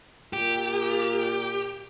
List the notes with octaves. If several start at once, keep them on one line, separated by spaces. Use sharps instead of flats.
A#2 G4